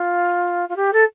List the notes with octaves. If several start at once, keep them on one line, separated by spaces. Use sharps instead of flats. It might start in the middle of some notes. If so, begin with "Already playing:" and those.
Already playing: F4
F4
G4
A4